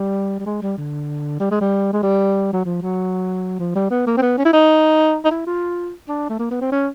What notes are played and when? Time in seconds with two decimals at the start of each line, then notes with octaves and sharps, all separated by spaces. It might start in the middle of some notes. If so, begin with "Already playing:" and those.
Already playing: G3
0.39 G3
0.46 G#3
0.62 G3
0.78 D3
1.40 G3
1.51 G#3
1.61 G3
1.93 G#3
2.03 G3
2.53 F#3
2.65 F3
2.82 F#3
3.59 F3
3.75 G3
3.90 B3
4.07 A#3
4.17 C4
4.22 B3
4.38 C#4
4.45 E4
4.53 D#4
5.25 D#4
5.31 E4
5.46 F4
6.08 D4
6.29 A3
6.39 A#3
6.51 B3
6.61 C4
6.72 C#4